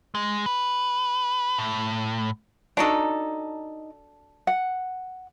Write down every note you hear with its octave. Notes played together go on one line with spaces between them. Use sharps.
G#3
B4
A2
D4 D#4 F#4 A4 A#5
F#5